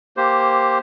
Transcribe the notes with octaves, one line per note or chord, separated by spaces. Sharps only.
A#3 G4 C5